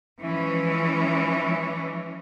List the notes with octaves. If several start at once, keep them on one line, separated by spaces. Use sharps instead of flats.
E3 F3 G#3 C#4